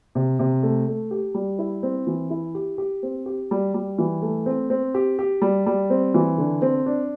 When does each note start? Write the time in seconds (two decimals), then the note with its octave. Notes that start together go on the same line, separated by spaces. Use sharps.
0.15 C3
0.39 C3
0.63 A3
0.87 A3
1.11 G4
1.34 G3
1.59 E4
1.83 C4
2.07 E3
2.30 E4
2.55 G4
2.78 G4
3.03 C4
3.26 G4
3.51 G3
3.74 G3
3.99 E3
4.22 A3
4.46 C4
4.70 C4
4.94 G4
5.19 G4
5.42 G3
5.66 G3
5.90 C4
6.14 E3
6.38 D3
6.62 C4
6.86 D4